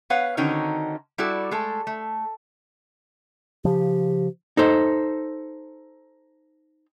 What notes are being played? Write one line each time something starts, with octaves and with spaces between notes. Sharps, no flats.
B3 B4 C#5 F5 F#5
D3 D#3 C4 C#4 D#4 F#4
G3 E4 F#4 A4 D5
G#3 A3 A4
A3
C#3 F3 G4
D#4 A4 C5